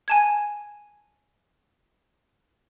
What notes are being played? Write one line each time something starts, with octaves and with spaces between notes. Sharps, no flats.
G#5 A5 G#6